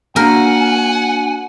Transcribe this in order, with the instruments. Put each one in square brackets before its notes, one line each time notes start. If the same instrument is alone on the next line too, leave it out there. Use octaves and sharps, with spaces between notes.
[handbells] A#3 D4 F#4 [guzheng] A#4 [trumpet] F#5 [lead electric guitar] G#5